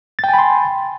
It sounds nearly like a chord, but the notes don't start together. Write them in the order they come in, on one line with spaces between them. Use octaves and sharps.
A6 G5 G#5 B5 C6